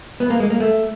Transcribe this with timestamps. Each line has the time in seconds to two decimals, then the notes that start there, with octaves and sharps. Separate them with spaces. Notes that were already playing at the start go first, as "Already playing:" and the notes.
0.20 B3
0.30 A#3
0.40 G#3
0.50 A#3
0.60 A3